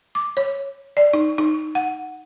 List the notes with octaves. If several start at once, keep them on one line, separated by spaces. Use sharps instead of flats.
D6
C#5
D5
D#4
D#4
F#5